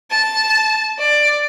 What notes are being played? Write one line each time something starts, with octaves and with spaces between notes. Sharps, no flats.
A5
D5